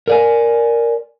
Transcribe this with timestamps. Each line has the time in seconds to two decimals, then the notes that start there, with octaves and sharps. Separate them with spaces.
0.08 A#4 D5 G#5